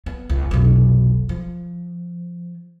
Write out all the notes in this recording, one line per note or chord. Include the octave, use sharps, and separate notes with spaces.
B3
C#2
F1 B1
F3